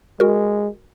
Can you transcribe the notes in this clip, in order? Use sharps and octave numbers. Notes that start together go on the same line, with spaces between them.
G#3 F#4 A#4